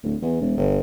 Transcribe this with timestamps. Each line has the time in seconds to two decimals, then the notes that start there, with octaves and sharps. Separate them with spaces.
0.03 D1
0.22 E2
0.41 E1
0.57 G1